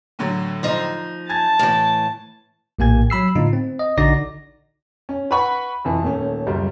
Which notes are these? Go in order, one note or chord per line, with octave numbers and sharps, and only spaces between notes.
A2 D3 F#3
F3 D#4
G#5 A5 G#6 A6
A2 E3
A#1 A2 A#3 G4 G#5 G#6
F#3 B5 E6 C7
A2 D3 B3 D#4 F4
C4
D#5
A#1 D3 D#4 F#4 D5 A#6
C#4
B4 F#5 B5 C#6
F2 E3
D#1 A3 C#4
C#2 F#2 G3